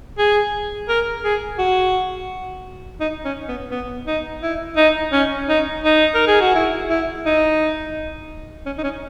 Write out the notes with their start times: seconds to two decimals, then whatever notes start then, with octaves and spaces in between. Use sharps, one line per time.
0.18 G#4
0.89 A#4
1.24 G#4
1.59 F#4
3.00 D#4
3.25 C#4
3.48 B3
3.71 B3
4.07 D#4
4.43 E4
4.77 D#4
5.12 C#4
5.49 D#4
5.84 D#4
6.14 A#4
6.27 G#4
6.41 F#4
6.55 E4
6.90 E4
7.26 D#4
8.66 C#4
8.78 D#4
8.84 C#4